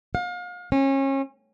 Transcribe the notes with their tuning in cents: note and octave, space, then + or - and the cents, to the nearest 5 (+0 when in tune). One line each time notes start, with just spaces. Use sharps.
F5 +35
C#4 -30